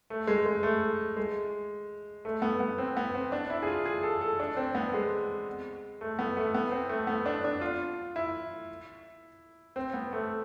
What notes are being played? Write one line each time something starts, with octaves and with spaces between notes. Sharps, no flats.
A3
G#3
G#3
A3
G#3
A3
B3
B3
C4
B3
C4
D4
E4
G#4
F4
G#4
A4
A4
D4
C4
B3
G#3
A3
B3
A3
B3
C4
A3
B3
D4
D4
F4
E4
C4
B3
A3